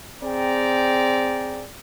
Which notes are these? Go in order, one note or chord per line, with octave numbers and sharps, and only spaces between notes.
C4 G#4 D5 G5 A#5